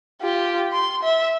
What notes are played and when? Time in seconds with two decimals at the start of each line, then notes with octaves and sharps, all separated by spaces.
0.22 F4 G4
0.73 C6
1.03 E5